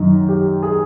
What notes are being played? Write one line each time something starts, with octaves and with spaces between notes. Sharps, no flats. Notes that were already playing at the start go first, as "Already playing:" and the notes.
Already playing: F#2 D#3
G4
G#4